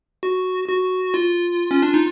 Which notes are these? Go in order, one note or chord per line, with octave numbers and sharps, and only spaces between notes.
F#4
F#4
F4
C#4
D4
D#4